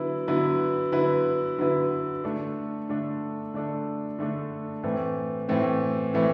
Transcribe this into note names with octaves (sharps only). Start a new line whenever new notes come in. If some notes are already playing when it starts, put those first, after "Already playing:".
Already playing: D3 F#3 B3 E4 B4
D3 F#3 B3 E4 B4
D3 F#3 B3 E4 B4
D3 F#3 B3 E4 B4
D3 A3 D4 A4
D3 A3 D4 A4
D3 A3 D4 A4
D3 A3 D4 A4
A2 E3 A3 C4
A2 E3 A3 C4
A2 E3 A3 C4